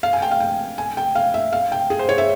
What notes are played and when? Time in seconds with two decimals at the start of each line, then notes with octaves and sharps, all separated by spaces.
0.03 F5
0.13 G#5
0.22 G5
0.31 F5
0.40 G5
0.78 G#5
0.97 G5
1.15 F5
1.34 E5
1.53 F5
1.72 G5
1.90 G#4
1.99 C5
2.09 C#5
2.18 E5